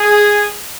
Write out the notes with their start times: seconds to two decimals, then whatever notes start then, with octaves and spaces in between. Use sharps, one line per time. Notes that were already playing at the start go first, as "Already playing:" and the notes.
Already playing: G#4